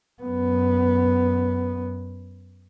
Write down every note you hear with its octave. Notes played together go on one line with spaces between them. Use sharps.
F#2 B3